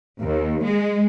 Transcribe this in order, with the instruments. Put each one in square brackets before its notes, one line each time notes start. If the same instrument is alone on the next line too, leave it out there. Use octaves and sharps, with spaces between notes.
[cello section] D#2
G#3